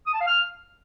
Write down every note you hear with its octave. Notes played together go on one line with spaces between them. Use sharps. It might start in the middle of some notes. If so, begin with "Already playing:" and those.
D#6
A5
F5
F6